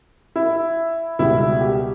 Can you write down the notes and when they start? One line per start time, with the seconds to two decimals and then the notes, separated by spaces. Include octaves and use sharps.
0.36 E4
1.19 C#2 B2 G3 E4
1.61 G4